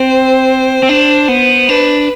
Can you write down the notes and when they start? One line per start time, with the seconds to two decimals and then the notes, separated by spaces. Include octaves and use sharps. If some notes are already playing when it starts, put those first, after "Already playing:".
Already playing: C4 C5
0.83 C4
0.89 D4
1.28 B3
1.68 D4 B4